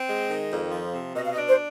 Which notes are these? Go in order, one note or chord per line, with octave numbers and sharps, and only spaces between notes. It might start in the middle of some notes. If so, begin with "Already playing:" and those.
Already playing: C4
G#3
D#3
F2
F3
C3
B2 D#5
F5
D#5
D4
C5